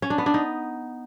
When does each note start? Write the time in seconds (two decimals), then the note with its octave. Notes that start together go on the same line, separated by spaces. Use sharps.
0.02 C#4
0.10 D4
0.18 B3
0.26 D4
0.34 D#4